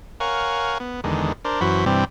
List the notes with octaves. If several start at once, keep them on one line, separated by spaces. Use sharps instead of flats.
A#4 C#5 F5 F#5 G#5
B3
E2 D3 D#3 G#3
D4 A#4 C5
F#2 E3 F#4 C5 B5
G2 C3 E3 G3 C4